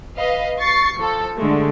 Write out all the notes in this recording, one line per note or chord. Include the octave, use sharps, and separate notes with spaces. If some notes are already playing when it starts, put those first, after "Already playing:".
B4 D#5 F5
C#6 A6 C7
F3 A4
D3 G#3 A3